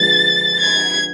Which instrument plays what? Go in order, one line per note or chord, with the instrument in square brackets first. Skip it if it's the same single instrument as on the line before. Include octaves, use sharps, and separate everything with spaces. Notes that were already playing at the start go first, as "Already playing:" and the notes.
Already playing: [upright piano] D3 F3 G#3 B3 D4 [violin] A6
[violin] G#6